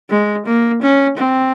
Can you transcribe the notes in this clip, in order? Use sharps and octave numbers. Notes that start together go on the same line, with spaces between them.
G#3
A#3
C#4
C4